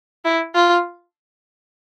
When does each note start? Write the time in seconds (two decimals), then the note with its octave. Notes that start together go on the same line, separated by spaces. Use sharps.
0.25 E4
0.54 F4